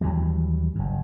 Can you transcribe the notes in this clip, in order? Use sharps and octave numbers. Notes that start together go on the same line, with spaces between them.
D#2 E3 F#3 G3
F#1 G2